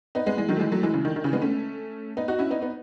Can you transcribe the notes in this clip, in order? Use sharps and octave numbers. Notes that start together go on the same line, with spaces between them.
B3 D#4
G#3 B3
E3 G#3
D#3 F#3
A3
E3 G#3
F#3 A3
E3 G#3
C#3 E3
D#3
D#3
C#3 E3
G#3 B3
A3 C#4
B3 D#4
D#4 F#4
C#4 E4
B3 D#4
B3 D#4